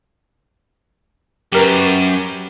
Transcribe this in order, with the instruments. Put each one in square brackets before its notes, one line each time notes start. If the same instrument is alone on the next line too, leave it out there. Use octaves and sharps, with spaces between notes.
[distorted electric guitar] F#2 [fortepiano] G4 A#4 B4